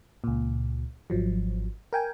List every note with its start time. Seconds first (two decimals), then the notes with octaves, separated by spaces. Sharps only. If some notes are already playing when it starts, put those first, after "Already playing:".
0.24 C#2 A#2
1.10 G#1 F3 F#3
1.93 A#4 G5 G#5